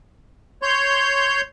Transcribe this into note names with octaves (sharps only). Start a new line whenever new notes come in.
C#5 C6 G6